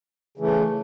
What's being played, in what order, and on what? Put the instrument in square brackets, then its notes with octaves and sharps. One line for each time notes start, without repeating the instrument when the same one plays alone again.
[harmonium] C#3 E3 A3